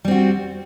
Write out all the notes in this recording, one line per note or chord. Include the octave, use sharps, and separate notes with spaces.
G3 C4 F#4